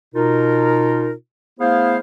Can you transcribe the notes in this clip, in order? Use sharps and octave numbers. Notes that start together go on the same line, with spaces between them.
B2 D#4 F4 A#4
A3 B3 E4 G#4 C5 F5